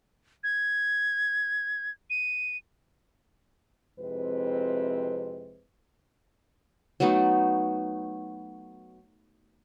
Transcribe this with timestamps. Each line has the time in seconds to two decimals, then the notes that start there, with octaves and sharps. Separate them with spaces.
0.44 G#6
2.10 D#7
3.99 F2 C3 G#3 C4 E4 B4
7.00 F#3 A3 B3 D#4